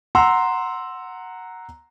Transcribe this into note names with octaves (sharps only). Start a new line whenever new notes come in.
F#5 A#5 C6 E6